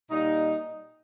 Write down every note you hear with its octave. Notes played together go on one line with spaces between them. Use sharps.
A#2 G3 D#4